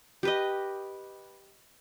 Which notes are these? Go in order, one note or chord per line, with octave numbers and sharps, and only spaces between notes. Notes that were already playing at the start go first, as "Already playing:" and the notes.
G4 B4 D#5